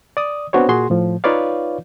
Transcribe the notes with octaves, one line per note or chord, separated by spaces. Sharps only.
D5 D#6
B3 C4 D4 F#4 C5 C#5
A#2 F#4 G#4 C6
A2 F3
D#4 F4 B4 C#5 D5 F5